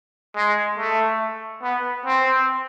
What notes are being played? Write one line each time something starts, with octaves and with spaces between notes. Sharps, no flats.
G#3
A3
B3
C4